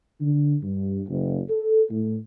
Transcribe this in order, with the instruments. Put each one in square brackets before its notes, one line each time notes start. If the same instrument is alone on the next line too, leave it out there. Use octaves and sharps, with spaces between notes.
[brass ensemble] D3
G2
F#1
A4
A2